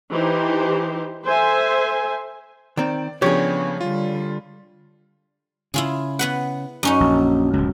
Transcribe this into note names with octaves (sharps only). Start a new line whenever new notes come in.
E3 D#4 G4 C5
A4 C5 E5 G#5
D#3 C4 D5
C#3 F3 B3 D4 G4 G#4 C#5
D3 G3 F4
C#3 E4 F4 G#4
B3 B4 F#5
F#2 C#4 D#4
A#1
D1 C#2